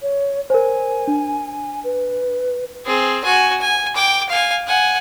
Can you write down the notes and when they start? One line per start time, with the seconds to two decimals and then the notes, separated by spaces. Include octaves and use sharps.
0.02 C#5
0.50 A#4 C5 G#5
1.07 D4
1.84 B4
2.85 C4 G#4
3.24 F#4 G#5
3.61 G#5
3.95 G5 D6
4.29 F5 G#5
4.67 F#5 G#5